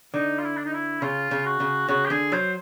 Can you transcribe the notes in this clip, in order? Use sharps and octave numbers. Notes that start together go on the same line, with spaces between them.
D3 D#4
F4
E4
D4
D#4
E4
C#3 F4
C#3
F#4
C#3
C#3 F#4
G4
D3 G#4
F#3 C5